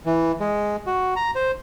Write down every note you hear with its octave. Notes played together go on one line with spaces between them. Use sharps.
E3
G#3
F#4
A#5
C5